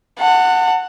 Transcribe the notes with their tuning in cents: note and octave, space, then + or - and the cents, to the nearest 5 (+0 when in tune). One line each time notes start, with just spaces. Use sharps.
F#5 +0 A5 +40